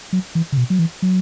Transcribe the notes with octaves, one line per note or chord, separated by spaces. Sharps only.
F#3
E3
C#3
B2
F#3
E3
F#3